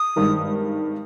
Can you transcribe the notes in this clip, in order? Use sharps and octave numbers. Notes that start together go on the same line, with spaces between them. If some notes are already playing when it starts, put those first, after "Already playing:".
Already playing: D#6
G#1 G2 D#3 G#3